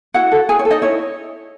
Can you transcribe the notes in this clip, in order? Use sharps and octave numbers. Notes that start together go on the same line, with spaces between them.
E4 F#4 F#5
A4
E4 G#4 G#5
C#5
A4
D#4 D#5
E4 C#5